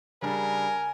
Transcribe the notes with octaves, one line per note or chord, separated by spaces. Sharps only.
C#3 G3 D4 A#4 G#5